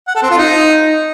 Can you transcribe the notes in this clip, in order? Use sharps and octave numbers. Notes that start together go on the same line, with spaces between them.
F#5
A4
C4
F4
D#4